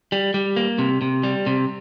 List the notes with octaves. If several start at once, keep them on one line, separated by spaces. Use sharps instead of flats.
G3
G3
A#3
C3
C3
G3
C3